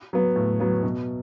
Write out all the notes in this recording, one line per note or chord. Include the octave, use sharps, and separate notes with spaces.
F#3 B3
A2
F#3 B3
B2